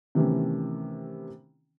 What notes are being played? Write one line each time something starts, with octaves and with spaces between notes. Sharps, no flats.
C3 D#3 E3 A3 B3 C#4